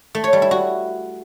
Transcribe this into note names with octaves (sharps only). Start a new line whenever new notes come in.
A3
C#5
G3
E4
F#4